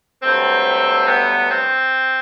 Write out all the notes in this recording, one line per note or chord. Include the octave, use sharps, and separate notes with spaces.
G2 F#3 A3 C4
B3
C4